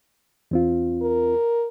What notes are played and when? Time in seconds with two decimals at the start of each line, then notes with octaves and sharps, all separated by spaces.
0.51 E2 C4 F4
1.02 A#4